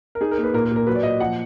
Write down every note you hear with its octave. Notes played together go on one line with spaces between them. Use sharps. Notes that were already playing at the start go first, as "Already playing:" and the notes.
A#4
D#4 G#4
A#4
A#3
B4
A#2 A#4
A#4
A#2
A#4
F#3 B4
D5
A#2 D#5
F3 F#5